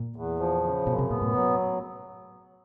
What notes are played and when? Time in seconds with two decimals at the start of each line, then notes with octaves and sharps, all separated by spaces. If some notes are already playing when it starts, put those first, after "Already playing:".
Already playing: A#2
0.16 E2
0.40 F3
0.64 C#3
0.87 F#2 B2
0.99 C3
1.10 A#2 B3
1.22 A2
1.33 F#3